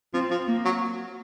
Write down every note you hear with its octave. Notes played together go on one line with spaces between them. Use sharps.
F3 C4
F3
A#3
F#3